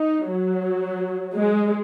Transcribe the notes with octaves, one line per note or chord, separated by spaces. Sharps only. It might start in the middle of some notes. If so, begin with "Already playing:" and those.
Already playing: D#4
F#3
G#3